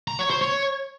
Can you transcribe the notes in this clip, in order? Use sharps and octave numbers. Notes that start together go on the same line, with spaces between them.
A#5
C#5
C5
C#5